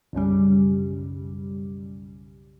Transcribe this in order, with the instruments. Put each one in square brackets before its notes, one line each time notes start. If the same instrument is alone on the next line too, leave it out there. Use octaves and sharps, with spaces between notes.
[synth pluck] B1 F#2 C#3 G3